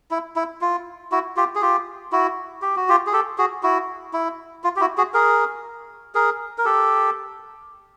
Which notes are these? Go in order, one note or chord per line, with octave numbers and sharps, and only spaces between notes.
E4
E4
F4
E4 F#4
F4 G4
G#4
F4 G4
E4 F#4
G4
F#4
F4 G4
G#4
G4 A4
F#4 G#4
E4 F#4
E4
F4
G4
E4 F#4
F#4 G#4
G#4 A#4
G#4 A#4
A#4
G4 A4